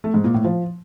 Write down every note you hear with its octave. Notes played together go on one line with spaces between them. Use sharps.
A3
G#2
A#2
A2
F3